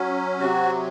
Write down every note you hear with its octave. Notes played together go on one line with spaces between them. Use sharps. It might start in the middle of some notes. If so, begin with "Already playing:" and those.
Already playing: F#3 C#4
C3 F#4